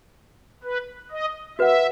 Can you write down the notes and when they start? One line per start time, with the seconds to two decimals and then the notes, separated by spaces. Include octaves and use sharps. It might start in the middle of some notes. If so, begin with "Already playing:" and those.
0.63 B4
1.11 D#5
1.58 F#4 B4 E5 F#5